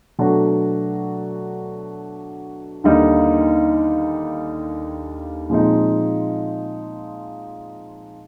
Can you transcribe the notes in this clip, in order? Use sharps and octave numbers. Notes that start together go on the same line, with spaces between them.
B2 F#3 A3 D4 F#4
D#2 D3 G3 A#3 D#4
A#2 F3 G#3 C4 D#4